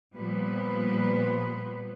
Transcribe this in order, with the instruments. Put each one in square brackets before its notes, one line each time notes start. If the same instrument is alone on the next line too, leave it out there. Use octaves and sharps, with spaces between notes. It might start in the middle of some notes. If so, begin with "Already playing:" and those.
[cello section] A#2 F3 G3 B3 B4